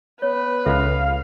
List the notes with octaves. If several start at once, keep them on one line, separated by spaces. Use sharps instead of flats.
B3 B4 C#5
C#2 A4 E5 F5